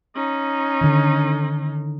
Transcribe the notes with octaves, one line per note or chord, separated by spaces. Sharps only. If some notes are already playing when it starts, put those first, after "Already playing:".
C#4 D#4
D3 D#3